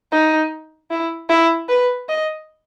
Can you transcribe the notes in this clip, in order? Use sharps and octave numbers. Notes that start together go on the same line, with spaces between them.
D#4
E4
E4
B4
D#5